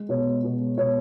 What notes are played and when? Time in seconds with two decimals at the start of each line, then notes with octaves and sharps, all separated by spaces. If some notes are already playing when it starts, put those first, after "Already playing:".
Already playing: G#3
0.09 B2 C#5
0.27 G#3
0.44 B2
0.61 G#3
0.77 B2 C#5